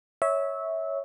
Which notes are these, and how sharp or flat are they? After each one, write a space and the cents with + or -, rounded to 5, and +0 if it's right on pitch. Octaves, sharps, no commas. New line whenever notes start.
C#5 +0 E5 -20